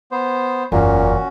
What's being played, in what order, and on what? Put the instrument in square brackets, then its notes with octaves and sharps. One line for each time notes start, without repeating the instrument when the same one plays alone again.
[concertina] B3 C5
[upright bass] F#1 E2 [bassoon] A#2 [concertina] C#4 F#4